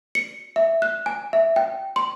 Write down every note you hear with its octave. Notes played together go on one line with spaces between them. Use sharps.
C#7
E5
F#6
G#5
E5
G5
C6